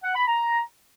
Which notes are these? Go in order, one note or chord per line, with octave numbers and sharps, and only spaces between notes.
F#5
B5
A#5